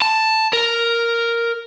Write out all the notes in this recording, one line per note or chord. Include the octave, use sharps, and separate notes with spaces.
A5
A#4